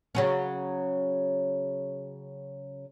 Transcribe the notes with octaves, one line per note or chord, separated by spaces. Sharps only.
C#3 F#3 C#4